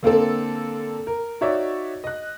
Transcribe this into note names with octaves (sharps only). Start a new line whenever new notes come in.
D3 A#3 C4 A4
A#4
D#4 F#4 C#5 D5 E5
D#5 F#6